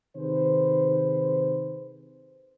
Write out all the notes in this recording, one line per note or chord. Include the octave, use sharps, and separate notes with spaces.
C3 D#3 G#4 B4 C5